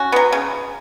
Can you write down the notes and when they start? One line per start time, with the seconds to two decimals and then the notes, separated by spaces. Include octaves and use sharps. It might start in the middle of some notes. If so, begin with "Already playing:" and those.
Already playing: C#4 F#4
0.12 F#3 B3
0.32 C#3